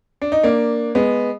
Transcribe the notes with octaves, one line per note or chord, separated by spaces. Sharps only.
D4
D#4
A#3 D4
G#3 B3